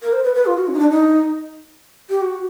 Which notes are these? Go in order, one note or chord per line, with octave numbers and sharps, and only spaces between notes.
A#4
C5
B4
B4
F4
F#4
C#4
D#4
D4
D#4
G4
F#4